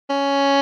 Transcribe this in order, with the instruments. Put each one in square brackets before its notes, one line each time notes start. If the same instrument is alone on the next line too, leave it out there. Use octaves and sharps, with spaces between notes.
[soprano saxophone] C#4